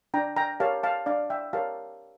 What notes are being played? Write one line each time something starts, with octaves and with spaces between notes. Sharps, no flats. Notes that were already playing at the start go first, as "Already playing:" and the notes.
D4 G5 A#5
G5 A#5
G4 A#4 C#5 F5 A5
F5 A5
D4 D5 F5
E5 G5
G4 A#4 C#5 F5 A5